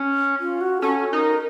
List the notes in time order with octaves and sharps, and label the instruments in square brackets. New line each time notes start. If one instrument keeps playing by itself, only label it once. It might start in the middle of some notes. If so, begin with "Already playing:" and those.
Already playing: [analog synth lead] C#4
[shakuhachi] F4
F#4
[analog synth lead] C#4 [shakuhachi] A4
[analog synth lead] D#4 [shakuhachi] A#4